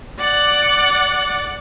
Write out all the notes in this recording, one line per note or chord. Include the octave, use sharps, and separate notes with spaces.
D5 F#5